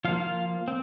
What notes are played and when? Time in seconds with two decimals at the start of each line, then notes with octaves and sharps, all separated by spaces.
0.05 F3 A#3 F4 F5
0.20 F4 F5
0.68 C4